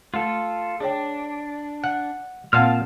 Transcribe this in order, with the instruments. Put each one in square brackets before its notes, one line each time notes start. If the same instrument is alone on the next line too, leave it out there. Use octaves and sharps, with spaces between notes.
[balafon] A3 [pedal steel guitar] F4 A4
[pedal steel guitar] D4 [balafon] G#4 C#5 G5
[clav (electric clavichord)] F#5
[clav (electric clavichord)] A#2 F5 [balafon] C4 F#5 C6 [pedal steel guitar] A5 F6